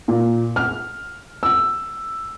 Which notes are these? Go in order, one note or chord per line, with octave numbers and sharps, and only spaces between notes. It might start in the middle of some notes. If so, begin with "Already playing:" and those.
A#2
F6
E6